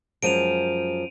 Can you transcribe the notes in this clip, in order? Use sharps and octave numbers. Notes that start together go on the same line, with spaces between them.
F#2 F3 G#3 D7 D#7 F7